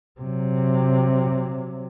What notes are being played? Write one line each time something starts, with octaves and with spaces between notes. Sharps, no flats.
C3 F#3